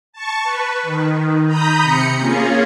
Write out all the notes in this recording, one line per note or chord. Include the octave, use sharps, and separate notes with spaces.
A5 C#6
B4
D#3
A#5 B5 D#6 G6
C3 C#7
A#3 C#4 F4 G#4